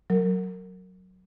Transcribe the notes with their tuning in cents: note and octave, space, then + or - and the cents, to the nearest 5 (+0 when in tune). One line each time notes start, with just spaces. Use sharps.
F#3 +0 A#4 -25